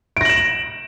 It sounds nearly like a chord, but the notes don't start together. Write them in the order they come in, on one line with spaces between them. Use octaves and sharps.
D7 A#6 F#7 E7